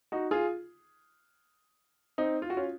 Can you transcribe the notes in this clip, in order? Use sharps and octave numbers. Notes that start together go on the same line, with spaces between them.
D#4 F#4
F4 G#4
C4 D#4
F4
F#4
C#4 F4